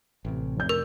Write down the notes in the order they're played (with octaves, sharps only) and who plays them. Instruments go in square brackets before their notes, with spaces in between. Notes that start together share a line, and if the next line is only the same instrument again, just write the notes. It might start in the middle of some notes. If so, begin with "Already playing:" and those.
[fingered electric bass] A1 C3
[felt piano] F1 G6
[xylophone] A#4